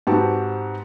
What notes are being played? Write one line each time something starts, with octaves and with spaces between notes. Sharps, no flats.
G#2 C4 F#4 G4 B4 A5